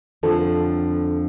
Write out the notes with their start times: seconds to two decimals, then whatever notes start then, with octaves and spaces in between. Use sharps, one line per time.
0.23 F2 D3 F3 A4